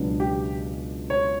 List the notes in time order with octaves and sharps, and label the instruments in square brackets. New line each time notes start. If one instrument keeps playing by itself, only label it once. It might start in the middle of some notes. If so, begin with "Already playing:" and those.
Already playing: [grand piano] C#2 B2 F#3 B3 D4
[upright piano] G4
C#5